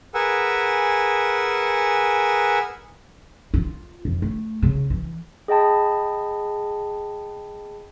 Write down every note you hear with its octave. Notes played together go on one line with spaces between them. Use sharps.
G#4 A#4 B4 F#5 G#5 E6
F4
F2
A3
C#3
E3
G#4 D#5 G5 A5 B5